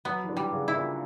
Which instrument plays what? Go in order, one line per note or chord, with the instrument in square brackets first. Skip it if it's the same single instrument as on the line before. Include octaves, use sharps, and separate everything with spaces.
[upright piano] F#3 [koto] B3
[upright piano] E3
D3
[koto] G3
[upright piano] C#3
[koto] E4
[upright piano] A#2